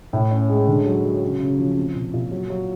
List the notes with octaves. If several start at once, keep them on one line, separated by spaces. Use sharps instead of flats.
A2
C#4
G#3
D3
F#3
F#3
C#3
C#3
F3
C4
A#2
A#2
F#3
F#3